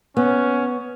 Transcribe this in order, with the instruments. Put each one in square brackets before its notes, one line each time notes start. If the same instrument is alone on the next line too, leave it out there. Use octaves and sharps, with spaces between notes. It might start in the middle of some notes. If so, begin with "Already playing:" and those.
[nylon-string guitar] B3 [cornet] C#4